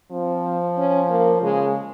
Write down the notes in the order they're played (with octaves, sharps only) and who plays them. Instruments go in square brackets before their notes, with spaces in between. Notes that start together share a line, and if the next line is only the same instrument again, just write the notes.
[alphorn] F3 [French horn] C4
[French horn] C#4
A#3
[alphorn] C#3 [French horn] G#3